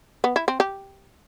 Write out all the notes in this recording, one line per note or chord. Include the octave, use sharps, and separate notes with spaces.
B3
E4
C4
G4